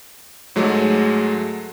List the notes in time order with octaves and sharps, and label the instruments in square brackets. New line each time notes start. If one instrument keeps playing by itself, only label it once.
[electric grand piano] G#2 F#3 G#3 A3